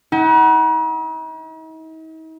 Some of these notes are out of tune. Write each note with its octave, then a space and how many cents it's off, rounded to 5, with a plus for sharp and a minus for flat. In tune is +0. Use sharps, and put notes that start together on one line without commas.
D#4 +45 F#5 +30